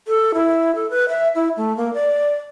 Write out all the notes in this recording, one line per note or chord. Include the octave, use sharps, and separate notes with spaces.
A4
E4
A4
B4
E5
E4
A3
A#3
D5